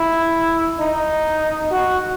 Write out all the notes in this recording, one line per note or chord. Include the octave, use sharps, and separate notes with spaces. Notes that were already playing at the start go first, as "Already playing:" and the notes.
Already playing: E4
D#4
F#4